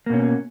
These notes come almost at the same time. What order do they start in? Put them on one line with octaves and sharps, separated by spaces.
A#3 B2 C#4